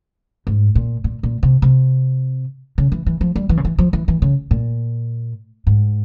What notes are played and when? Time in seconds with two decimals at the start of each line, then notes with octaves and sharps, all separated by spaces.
0.47 G#2
0.75 A#2
1.04 A#2
1.23 A#2
1.43 C3
1.62 C3
2.78 C#3
2.92 E3
3.06 E3
3.21 F3
3.36 G3
3.49 E3
3.57 C#3
3.65 E3
3.78 F3
3.93 E3
4.08 E3
4.22 C#3
4.51 A#2
5.67 G#2